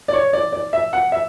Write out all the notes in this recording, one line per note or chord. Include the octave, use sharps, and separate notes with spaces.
D5
C#5
D5
D5
E5
F#5
E5